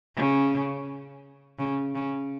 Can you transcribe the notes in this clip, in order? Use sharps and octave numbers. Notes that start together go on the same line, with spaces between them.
C#3
C#3
C#3